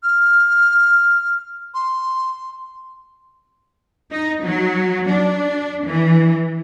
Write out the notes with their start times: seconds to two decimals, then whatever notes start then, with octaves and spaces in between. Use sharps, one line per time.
0.03 F6
1.74 C6
4.11 D#4
4.43 F#3
5.08 D4
5.85 E3